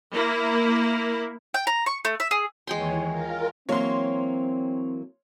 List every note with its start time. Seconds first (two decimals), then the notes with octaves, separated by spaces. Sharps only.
0.13 A#3 E4
1.54 G5
1.67 A#5
1.86 C#6
2.05 A3
2.20 E5
2.31 G#4
2.67 D#2 E3 G#3 C#5 G5 C6
3.06 F4 A#4
3.69 E3 F#3 A#3 C4 C#5 C6